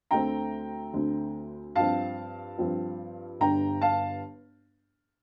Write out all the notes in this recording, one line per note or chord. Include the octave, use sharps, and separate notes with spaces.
D2 D3 A3 C4 G5 A#5
D2 D3 A3 C4
G2 F3 C4 F5 A5
G2 F3 C4
G1 G2 D3 G3 G5 A#5
F5 A5